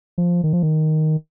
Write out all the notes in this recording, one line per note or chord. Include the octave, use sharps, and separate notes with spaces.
F3
D#3
F3
D#3